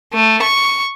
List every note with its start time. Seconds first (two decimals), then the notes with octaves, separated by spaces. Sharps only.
0.13 A3
0.42 C#6